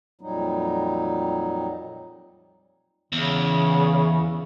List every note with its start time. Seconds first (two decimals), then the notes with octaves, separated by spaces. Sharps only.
0.21 F2 A#2 F#3 G3 D#4
3.12 E2 C#3